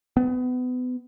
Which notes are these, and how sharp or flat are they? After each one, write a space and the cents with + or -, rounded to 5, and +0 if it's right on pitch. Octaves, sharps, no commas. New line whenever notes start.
B3 +30